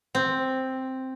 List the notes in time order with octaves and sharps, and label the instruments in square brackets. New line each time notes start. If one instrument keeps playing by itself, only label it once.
[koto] C4